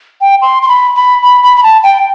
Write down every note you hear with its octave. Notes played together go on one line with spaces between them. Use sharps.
G5
C6
C6
B5
B5
B5
B5
B5
A5
G5